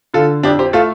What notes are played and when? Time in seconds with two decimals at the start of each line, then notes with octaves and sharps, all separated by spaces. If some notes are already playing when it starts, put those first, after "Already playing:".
0.14 D3 F4 A4
0.43 F2 D4 G4
0.59 G4 C5
0.73 A3 F4 A4